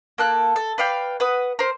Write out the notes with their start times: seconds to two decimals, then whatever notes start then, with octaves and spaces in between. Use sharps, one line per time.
0.18 A#3 A4 F#6
0.56 A4
0.78 B4 D5 F5 G5
1.20 B4 F#5 D#6
1.59 A#4 C5